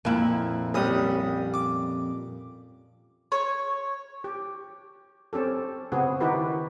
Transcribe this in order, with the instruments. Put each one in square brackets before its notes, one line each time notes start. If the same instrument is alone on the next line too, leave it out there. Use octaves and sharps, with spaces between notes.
[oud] F2 E4 [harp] A#2
[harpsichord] C2 D#6 [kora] G3 C#4
[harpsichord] D6
[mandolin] C#5
[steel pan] G4
C4 C#4 G4 A4
C#3 B3 C4 F#4 G#4
D#3 D#4 E4 F#4 G4 B4